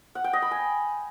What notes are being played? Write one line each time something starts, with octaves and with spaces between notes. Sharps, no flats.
F#5
G5
D#5
B5
G#5